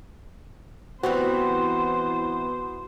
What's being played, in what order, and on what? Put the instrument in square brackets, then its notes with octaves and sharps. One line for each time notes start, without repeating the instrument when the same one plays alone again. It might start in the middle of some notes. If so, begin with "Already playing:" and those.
[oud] E3 G3 C4 [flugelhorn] B3 [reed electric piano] F#4 [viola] C5